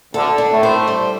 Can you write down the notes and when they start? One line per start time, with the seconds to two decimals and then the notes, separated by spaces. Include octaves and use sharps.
0.14 D2 D3 A4
0.38 D4
0.51 A2 A3
0.63 C5
0.88 G3